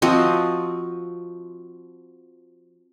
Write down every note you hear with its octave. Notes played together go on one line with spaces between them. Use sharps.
F3 C4 F#4 D#5